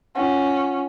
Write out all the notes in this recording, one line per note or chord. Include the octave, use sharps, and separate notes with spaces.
C#4 F4 F#5